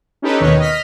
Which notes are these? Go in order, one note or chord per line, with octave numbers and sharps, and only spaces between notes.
C#4 D#4 G4 A4 B4
D#2 B2 D#3 B4 C#5 D#5
D#5 F6 B6